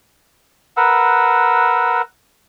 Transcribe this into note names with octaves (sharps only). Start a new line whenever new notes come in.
A#4 B4 F#5 E6